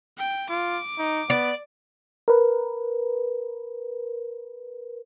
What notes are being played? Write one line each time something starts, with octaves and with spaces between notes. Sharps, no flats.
G5
F4 D6
D#4
B3 D5
A#4 B4